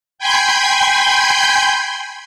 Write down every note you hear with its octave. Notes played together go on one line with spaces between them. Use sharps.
G5 G#5 B5 C6 G6 G#6